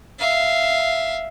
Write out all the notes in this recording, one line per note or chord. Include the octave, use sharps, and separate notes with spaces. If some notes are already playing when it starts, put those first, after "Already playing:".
E5 F5